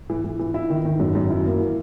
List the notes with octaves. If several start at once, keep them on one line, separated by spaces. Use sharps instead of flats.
E3
E3
E3
E4
D#3
D#3
F#2
F#2
E4
A#3
E3